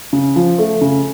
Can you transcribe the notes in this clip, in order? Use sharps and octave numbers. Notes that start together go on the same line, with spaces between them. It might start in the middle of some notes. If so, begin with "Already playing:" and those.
C#3
F3
A3
C#3